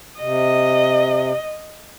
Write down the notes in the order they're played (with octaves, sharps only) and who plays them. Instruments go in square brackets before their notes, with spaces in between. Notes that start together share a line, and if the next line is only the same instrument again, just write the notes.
[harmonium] C3 [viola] D#5